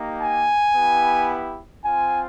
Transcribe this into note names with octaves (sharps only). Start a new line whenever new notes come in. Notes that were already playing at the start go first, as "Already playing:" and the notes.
Already playing: A#3 D#4 G4
G#5
B3 E4 G4
C4 F4 G#5